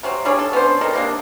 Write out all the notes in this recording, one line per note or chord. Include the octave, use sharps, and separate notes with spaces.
C3 F#3 C4
G3 D4 G#4 C#5
A4
B3 C#4 D4 C5
C4 A4 A#4 D#5
C3 A#3 D4